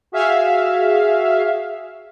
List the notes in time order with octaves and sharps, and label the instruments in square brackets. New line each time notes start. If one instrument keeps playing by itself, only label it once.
[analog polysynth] F#4 G#4 E5 F5